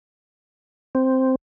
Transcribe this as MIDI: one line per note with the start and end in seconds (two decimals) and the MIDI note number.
0.95 1.35 60